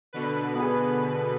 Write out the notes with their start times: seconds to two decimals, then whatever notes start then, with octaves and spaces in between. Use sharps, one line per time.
0.13 B2 D3 B4
0.55 B3 G#4